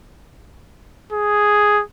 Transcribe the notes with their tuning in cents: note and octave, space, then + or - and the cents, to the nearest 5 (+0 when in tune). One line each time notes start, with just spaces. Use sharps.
G#4 +0